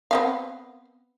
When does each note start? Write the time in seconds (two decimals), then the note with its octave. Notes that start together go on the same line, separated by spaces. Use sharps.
0.11 B3 C4 F5